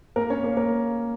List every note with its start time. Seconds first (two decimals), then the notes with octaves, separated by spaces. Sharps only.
0.16 A#3 A#4
0.30 C#4 C#5
0.43 A#3 A#4
0.57 A#3 A#4